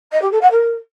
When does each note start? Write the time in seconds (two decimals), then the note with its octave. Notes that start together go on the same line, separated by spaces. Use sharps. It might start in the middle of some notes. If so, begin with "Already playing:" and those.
0.12 D#5
0.21 G4
0.31 A4
0.41 F#5
0.51 A#4